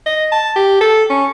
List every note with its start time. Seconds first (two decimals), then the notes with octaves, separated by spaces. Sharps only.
0.06 D#5
0.32 A5
0.56 G4
0.81 A4
1.10 C#4